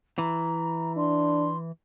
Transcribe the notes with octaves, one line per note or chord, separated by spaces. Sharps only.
E3 A#5
D4 C6